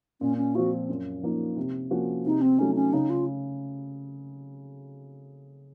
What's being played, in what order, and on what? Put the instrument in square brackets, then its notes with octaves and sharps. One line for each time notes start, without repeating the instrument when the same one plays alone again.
[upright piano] A#2 [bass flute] C#4
[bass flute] C#4
[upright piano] F3 C4 F4 [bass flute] F#4
[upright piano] F#2
F3 A#3 D#4
C3
F3 A#3 C#4 F#4
[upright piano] C3 [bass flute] D#4
[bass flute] C4
[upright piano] F#3 A3 D#4 [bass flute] C#4
[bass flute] C#4
[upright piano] C#3 [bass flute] D#4
[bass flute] F4